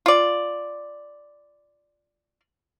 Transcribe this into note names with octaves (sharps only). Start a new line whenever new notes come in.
F4 D5